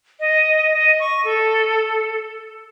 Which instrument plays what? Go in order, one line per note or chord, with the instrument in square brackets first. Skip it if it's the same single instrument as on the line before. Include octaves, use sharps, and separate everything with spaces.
[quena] D#5
D#5
C#6
A4